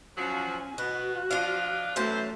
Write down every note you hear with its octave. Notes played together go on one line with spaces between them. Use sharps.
F3 F#3 C#4 F#4 G#5
B2 B3 F#4 F#6
F3 D4 F4 D#5 F5
E3 F#3 A3 C#4 C5 A5